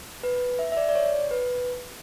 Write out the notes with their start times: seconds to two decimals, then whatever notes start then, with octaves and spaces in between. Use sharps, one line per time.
0.23 B4
0.59 E5
0.72 E5
0.77 D5
0.89 D5
0.95 C#5
1.31 B4